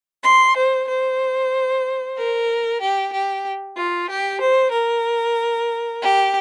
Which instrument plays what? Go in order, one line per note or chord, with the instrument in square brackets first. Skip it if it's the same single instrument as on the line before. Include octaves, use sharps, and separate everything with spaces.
[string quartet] C6
C5
C5
A#4
G4
G4
F4
G4
C5
A#4
G4